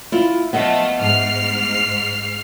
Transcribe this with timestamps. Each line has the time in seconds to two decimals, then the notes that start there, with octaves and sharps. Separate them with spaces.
0.12 E4 F4
0.53 F3 A3 B3 D#5 E5
0.99 G#2 F6 C7